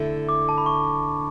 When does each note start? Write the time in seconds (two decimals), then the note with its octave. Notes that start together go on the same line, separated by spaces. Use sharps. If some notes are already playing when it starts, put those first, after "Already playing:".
Already playing: D3 A3 E4 A4
0.29 D6
0.49 A5
0.58 B5
0.66 C#6